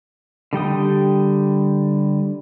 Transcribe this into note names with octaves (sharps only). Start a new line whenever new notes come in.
D3 G3 G5 D#6